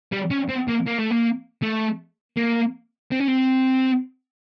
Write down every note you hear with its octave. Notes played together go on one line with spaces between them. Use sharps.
G3
C#4
C4
A#3
A#3
A3
A#3
A3
A#3
C4
C#4
C4